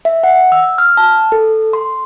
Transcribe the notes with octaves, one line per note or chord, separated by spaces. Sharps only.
E5
F#5
E6
F6
A5
A4
C6